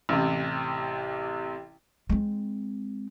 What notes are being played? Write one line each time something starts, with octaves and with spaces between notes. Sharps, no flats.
A1 C3
G#3 C4